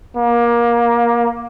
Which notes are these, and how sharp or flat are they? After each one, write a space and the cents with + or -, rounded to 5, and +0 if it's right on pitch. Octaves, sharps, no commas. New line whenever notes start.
A#3 +20